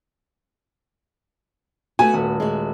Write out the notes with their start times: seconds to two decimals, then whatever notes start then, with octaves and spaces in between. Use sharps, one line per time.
1.99 A3 B3 F#4 G#5
2.14 D#1
2.40 G#3 F#4